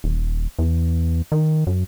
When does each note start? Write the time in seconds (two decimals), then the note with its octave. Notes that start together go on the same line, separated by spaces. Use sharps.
0.04 D#1
0.59 E2
1.32 D#3
1.67 F#2